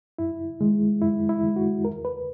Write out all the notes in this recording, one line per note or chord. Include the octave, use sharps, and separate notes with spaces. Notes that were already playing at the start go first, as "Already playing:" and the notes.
F#2 E4
D#3 G#3
F#2 E4
E4
D#3 G#3
F#4
E2 A#4
B4